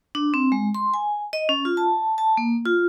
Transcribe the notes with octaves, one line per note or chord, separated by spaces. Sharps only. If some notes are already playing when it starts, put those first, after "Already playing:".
D4
C4
G#3
C6
G#5
D#5
C#4
F4
A5
A5
A#3
F4